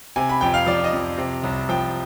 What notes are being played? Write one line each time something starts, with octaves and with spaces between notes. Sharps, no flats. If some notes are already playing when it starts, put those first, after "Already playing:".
C3 G#5
B5
F2 G5
F5
F3 D5
D#5
F2
C3
C2
F3 G5